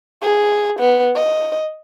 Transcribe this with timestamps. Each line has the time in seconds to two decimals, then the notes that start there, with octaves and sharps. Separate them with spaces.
0.23 G#4
0.80 B3
1.16 D#5